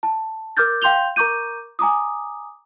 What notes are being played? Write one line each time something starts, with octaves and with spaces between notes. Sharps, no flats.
A5
A#4 D6 F6 G6 A6
F5 G5 C6 G6 F7 G7
A#4 A#5 C#6 D6 G6 D#7
G#5 A#5 D6 D#6